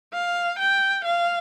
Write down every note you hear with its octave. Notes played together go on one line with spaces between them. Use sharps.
F5
G5
F5